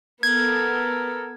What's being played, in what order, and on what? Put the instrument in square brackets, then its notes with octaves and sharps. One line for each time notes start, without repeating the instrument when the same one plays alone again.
[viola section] B3 A4 [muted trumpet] A#4 [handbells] G#6